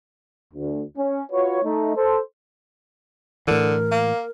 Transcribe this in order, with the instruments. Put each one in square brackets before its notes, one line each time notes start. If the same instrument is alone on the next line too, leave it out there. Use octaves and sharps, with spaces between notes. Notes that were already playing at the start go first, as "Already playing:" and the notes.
[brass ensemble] D2
C#4
F4 F#4 B4 C#5
A3 D#4
A4 C5
[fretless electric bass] A2 E3 [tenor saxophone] D3 [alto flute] A#4
[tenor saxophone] A#3